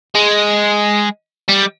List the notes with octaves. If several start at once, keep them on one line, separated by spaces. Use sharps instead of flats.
G#3
G3